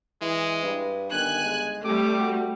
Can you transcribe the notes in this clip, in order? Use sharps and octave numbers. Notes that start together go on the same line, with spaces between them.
E3 G#3
G2 B4
G1 D#3 G#5 F#6
G#3
C3 G3 A3 G4 D6
F#4